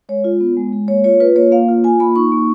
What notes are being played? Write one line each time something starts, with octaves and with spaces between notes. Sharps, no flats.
G#3 C#5
F4
B3
G#3
G#3
A#3 C#5
F4 C#5
F4 B4
A#3 C#5
A#3 F5
F4
F4 G#5
A#3 B5
D#4 C#6
A#3